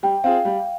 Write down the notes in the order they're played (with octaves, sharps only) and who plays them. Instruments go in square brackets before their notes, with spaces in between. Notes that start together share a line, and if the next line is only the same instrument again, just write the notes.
[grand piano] G3 [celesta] G5
[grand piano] C4 F4 G#4 [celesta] F5
[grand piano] G3